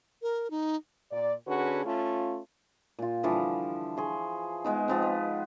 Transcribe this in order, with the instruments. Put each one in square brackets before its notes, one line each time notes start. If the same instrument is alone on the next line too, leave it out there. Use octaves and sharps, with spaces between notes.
[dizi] A#4
D#4
[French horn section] A#2 D5
D3 C#4 F#4 G#4 B4
A3 C#4 F4
[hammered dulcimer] A#2 F4
D3 E3 F3 G3
G#4 C6 C#6
G#3 B3 D#4
F3 B3 C4
B4